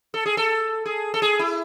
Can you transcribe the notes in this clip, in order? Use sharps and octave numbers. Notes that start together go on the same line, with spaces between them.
A4
G#4
A4
G#4
A4
G#4
E4